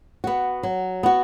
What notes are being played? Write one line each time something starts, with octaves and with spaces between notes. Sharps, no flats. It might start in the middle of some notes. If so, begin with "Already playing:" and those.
B3 F#4
F#3
B3 F#4